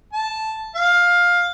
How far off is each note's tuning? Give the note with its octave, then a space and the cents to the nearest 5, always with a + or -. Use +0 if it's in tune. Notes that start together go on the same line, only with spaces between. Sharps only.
A5 -5
F5 +15